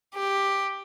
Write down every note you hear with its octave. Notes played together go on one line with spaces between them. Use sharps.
G4